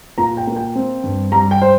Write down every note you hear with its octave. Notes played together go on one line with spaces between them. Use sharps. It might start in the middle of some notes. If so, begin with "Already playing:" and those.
A#2 A#5
G5
A#3
G5
C4
G2
G3 A#5
G5
C5